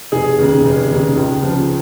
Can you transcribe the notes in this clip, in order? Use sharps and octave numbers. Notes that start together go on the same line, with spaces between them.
F1 G#4
D#2 C#3
F1
D#2 C#3
C#2
C#3 F3